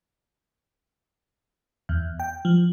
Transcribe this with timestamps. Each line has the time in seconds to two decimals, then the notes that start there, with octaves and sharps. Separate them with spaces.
1.89 E2
2.20 G5
2.45 F3